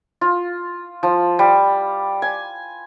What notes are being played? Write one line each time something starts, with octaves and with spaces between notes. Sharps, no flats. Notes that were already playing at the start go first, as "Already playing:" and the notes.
F4
F3
G3
G#5